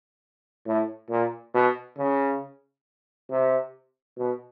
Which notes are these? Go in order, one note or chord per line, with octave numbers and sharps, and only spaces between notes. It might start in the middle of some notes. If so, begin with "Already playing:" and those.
A2
A#2
B2
C#3
C3
B2